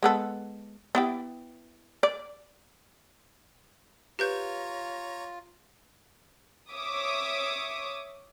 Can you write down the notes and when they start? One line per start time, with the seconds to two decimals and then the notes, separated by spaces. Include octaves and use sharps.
0.03 G#3 B3 A4
0.95 B3 E4 G4
2.03 D5
4.19 F4 G4 B4 C#5 A#5 G6
6.71 C#5 E5 D6 D#6